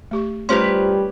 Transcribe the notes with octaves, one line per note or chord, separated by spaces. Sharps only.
A3 G4 C#6
G3 A3 C#4 F4 G4 B4 C5 C6